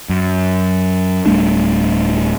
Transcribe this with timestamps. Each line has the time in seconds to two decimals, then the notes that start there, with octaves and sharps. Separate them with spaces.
0.09 F#2
1.26 D1 G3 A3 D4